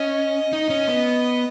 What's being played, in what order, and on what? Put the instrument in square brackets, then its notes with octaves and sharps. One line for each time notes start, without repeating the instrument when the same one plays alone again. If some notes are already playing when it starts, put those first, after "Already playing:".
Already playing: [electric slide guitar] C#4 [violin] D#5
[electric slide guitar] D#4
C#4
B3